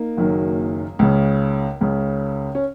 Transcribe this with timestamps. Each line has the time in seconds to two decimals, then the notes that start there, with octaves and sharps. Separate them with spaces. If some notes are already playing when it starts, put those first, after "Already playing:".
Already playing: A#3 D#4
0.17 F#1 F#2 D#3
0.99 C#2 C#3
1.81 C#2 C#3
2.55 C#4